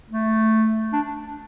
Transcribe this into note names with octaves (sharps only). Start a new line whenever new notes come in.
A3
D4